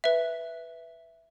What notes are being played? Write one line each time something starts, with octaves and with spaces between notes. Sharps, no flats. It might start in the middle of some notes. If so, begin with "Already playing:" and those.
B4 E5